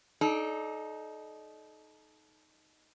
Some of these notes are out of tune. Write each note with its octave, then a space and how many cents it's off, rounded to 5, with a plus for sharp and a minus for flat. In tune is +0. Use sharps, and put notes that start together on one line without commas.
D#4 +0 A4 -35 D5 +0